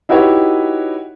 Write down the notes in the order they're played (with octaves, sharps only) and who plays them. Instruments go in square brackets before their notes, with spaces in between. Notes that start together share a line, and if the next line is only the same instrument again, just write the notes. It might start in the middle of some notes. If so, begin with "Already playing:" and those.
[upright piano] D#4 E4 F#4 G4 B4 C#5